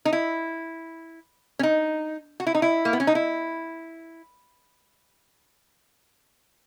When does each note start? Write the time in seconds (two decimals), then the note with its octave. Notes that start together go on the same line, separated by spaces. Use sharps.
0.05 D#4
0.13 E4
1.59 C#4
1.63 D#4
2.40 F#4
2.47 E4
2.55 D#4
2.62 E4
2.85 A#3
2.93 B3
3.00 C#4
3.07 D#4
3.15 E4